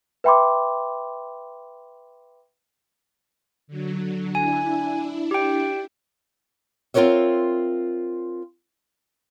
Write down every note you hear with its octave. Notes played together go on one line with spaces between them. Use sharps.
B4 E5 G5 B5 C6 D6
D3 F#3
D4 E4 G#5
G4 G5
C4 F4 G4 A#4 C#5 E5